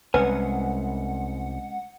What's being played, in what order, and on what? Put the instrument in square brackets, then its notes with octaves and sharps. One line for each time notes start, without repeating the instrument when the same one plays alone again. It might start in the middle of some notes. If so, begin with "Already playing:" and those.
[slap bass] C2 [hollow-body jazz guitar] G#3 C#4 G#5 [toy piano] B4 [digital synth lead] F#5